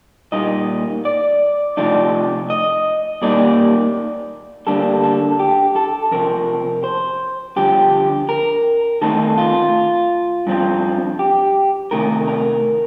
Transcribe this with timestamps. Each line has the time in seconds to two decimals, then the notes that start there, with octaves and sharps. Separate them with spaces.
0.32 A#2 G3 A#3 D#4 D#5
1.05 D5
1.77 C3 F3 A3 D#4 D5
2.50 D#5
3.22 A#2 G3 A#3 D#4 D5
4.67 D3 G3 A#3 D4 A4
5.03 A4
5.39 G4
5.76 A4
6.11 F2 C3 F3 C4 A#4
6.84 C5
7.56 G2 D3 F3 G4
8.29 A#4
9.01 D#3 A3 C4 D#4 A4
9.38 F4
10.47 G2 F3 C4
11.19 G4
11.91 C3 D#3 A3 A#4
12.27 A#4